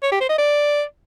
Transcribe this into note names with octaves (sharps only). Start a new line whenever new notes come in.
C#5
G4
C5
D#5
D5